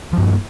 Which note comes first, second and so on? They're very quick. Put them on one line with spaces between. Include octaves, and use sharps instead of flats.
F3 G2 A#3